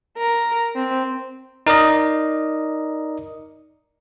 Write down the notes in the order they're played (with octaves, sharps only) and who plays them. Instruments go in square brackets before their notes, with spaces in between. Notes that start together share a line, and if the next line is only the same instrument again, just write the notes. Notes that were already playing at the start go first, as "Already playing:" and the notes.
[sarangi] A#4
C4
[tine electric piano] D#4 A#4 D5 D#5